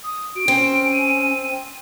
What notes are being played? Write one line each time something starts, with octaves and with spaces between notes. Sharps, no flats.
D#6
F#4 D7
C4 C#4
D#7